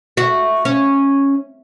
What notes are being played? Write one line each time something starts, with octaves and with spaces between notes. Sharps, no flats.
F#4 E5
C#4